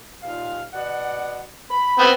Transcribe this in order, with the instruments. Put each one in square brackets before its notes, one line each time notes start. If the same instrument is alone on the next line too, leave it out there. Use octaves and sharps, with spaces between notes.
[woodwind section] D#2 A#2 F5
B2 D5 F#5
B5
[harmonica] B3 C4